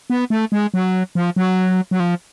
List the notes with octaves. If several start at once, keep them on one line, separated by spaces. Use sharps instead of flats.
B3
A3
G#3
F#3
F3
F#3
F#3
F3